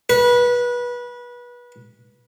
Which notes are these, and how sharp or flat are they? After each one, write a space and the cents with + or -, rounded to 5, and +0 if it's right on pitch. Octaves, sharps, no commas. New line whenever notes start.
B4 -25